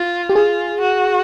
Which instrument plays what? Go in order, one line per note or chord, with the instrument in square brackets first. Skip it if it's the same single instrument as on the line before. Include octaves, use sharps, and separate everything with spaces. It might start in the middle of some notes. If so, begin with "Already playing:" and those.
Already playing: [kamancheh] F4
[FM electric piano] G4
[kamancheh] F4 [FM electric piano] G#4
[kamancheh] F#4